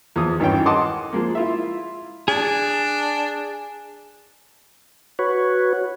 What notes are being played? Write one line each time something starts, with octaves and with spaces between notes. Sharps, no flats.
E2 F3 D#6
G#1 G2 E3 C#4 G5
D#5 F#5 A5 C6 D6 D#6
F3 G#3 A#3
E4 F4 E5
D4 G#4
F#4 B4 C#5